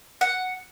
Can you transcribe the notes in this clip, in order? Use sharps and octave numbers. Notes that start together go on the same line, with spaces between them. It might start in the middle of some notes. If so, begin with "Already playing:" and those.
F#5